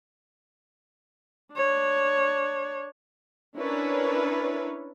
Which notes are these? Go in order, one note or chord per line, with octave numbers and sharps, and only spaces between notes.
D4 C#5
C#4 D4 E4 A#4 B4 C#5